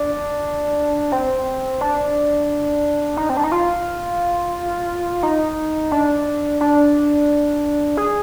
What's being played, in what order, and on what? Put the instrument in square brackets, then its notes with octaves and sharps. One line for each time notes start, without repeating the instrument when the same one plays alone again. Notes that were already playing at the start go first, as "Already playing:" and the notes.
Already playing: [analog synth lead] D4
C4
D4
D#4
C4
D4
D#4
F4
D#4
D4
D4
G#4